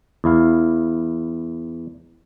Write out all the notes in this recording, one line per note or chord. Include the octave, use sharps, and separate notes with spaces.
E2 E4 F5